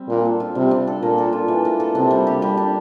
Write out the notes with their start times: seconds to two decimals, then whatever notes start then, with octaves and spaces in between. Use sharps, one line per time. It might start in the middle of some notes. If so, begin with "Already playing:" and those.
Already playing: G3 C4
0.09 A#2 D4
0.25 A4
0.40 F4
0.55 C3 G3
0.71 D4
0.87 A4
1.02 A#2 A#3
1.18 A4
1.33 F4
1.48 E3
1.65 A#3
1.80 A4
1.95 C3 D4
2.11 G3
2.27 G4
2.42 G3
2.57 D4